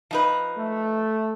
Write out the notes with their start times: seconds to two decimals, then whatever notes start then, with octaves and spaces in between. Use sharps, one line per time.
0.11 F3 D#4 B4
0.57 A3